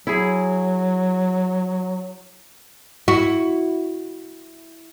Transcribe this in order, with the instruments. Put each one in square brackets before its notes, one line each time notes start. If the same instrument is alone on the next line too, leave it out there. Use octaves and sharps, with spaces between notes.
[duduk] F#3 [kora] E4 G#4
[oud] E4 F#4